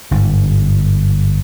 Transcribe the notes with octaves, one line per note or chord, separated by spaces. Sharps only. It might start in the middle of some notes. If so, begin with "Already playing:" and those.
G1 G#2